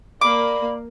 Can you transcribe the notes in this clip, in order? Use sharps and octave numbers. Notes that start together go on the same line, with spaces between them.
A#3 D5 B5 D6